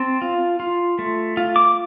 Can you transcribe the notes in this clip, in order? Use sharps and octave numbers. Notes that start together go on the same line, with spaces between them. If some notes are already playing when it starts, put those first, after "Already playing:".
Already playing: C4 A5
F4
F4
A3
F4
D6